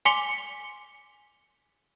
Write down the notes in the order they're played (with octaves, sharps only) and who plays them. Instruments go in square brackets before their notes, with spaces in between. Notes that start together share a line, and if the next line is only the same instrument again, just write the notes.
[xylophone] G#5 C6 D6 B6 C#7 G7